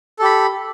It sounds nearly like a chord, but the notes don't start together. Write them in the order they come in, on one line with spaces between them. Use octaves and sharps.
A4 G4 B5